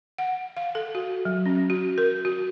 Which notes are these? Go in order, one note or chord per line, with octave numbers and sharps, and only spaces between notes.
F#5
F5
A4
F#4
F#3
C#4
F#4
A#4
F#4